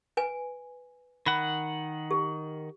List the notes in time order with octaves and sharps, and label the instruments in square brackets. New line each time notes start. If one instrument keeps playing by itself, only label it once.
[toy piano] B4 G#5
[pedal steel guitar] D#3 F#5 [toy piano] B5
[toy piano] G4